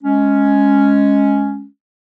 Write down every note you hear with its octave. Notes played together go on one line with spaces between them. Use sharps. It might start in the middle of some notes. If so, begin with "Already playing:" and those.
G#3 C#4